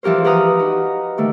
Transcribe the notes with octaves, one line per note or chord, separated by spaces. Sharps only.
E3 F3 G4 A#4 C5
G4 B4 F#5 A#5 D#6 F6
D#4 F#4
D#3 A3 G4